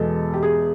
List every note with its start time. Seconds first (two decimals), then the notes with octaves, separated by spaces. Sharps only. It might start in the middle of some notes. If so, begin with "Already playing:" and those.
Already playing: E2 B2 G#3 A4
0.34 G4
0.43 G#4